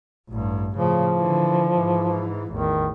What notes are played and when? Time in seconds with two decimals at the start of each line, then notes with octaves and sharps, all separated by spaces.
0.29 A1 G2
0.77 A2 C#3 F3
1.16 D3 E3
1.75 G#2 E3
2.52 A1 E2 D#3